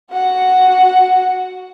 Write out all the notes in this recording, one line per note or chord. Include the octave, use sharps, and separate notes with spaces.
F#4 F#5